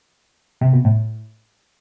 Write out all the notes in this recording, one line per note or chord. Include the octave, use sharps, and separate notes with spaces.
C3
B2
A2